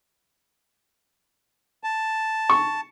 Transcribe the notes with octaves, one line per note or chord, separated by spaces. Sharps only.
A5
C#6